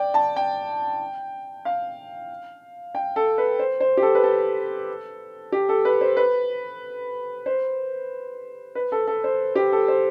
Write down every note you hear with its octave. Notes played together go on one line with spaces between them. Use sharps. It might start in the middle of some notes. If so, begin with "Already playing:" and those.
Already playing: D5 G5
A5
G5
F5
G5
A4
B4
C5
C5
G4
A4
B4
A4
G4
A4
B4
C5
B4
C5
B4
A4
A4
C5
G4
A4
C5